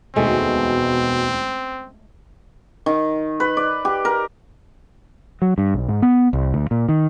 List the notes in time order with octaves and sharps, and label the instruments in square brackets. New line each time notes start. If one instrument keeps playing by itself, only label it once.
[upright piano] E1 D2 D#3 [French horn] B2 [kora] G#3 A3 C#4 [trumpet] C4
[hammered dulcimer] D#3
B4
D5
G4
A#4
[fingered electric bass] F#3
G2
B1
G#2
B3
C2
D2
A#2
D#3